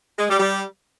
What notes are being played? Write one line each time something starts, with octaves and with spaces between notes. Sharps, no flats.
G#3
G3
G3